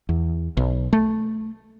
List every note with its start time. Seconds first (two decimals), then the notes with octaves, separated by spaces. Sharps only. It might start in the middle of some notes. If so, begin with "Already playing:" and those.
0.09 E2
0.57 B1
0.93 A3